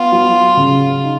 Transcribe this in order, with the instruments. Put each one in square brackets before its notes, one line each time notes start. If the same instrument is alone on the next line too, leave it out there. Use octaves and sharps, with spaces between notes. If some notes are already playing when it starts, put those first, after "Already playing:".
Already playing: [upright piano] B3 [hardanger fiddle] F4
[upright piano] F#3
C#3
D#4